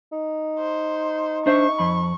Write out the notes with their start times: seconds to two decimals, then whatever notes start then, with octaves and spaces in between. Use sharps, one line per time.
0.12 D#4
0.59 C5
1.46 D4 C5 E5 C#6
1.79 F2 B5